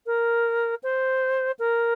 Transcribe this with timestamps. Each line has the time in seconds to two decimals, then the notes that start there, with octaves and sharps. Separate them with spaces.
0.06 A#4
0.83 C5
1.59 A#4